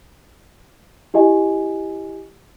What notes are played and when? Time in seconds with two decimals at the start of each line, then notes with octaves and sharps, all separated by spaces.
1.14 E4 G4 D#5 G#5